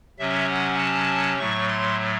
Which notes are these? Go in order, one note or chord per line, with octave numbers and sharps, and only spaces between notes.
C3 F#3 C#4 E5
F#5
A5
A2 F#3 A3 C#6
C6